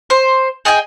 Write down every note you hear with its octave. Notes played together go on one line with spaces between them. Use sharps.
C5
G#4 D#5 G5 G#5